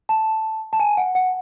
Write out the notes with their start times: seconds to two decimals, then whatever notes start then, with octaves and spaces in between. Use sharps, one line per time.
0.09 A5
0.73 A5
0.80 G#5
0.97 F#5
1.15 F#5